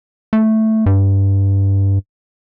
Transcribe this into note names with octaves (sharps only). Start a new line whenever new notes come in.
A3
G2